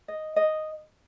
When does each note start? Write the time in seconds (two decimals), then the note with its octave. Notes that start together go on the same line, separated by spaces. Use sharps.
0.08 D#5
0.36 D#5